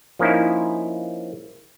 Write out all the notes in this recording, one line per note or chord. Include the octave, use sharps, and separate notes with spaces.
F3 A#3 C#4 D#4 E4